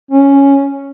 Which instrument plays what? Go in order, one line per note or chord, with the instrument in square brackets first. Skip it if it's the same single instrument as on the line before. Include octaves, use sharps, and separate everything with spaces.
[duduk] C#4